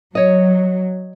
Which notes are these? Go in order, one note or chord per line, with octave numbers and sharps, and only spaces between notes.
F#3 C#5 D#5